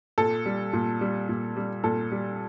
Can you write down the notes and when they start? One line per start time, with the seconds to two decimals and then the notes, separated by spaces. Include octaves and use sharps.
0.18 A#2 A4
0.46 G3
0.73 A#2
1.01 G3
1.29 A#2
1.57 G3
1.84 A#2 A4
2.12 G3